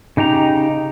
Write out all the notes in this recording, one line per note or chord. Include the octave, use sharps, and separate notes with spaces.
C#3 D#4 G4 A#5